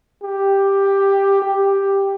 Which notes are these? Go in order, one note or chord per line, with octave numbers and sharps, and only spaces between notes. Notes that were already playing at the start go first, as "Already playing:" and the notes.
G4
G4